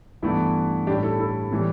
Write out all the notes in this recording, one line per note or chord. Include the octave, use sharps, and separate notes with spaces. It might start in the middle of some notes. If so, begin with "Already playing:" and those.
G2 E3 A3 B3 E4
A2 G3 D4 G4
E4 A4
E4 A4
A2 E3 G3